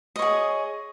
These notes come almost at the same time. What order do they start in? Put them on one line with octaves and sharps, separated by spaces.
D#5 C#5 G#4